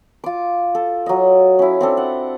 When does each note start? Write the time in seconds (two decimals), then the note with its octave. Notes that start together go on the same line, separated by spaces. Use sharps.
0.24 F4 D6
0.75 A4
1.06 F#3 D#5
1.59 C#4 E4
1.81 C4 D4 A4
1.97 F#5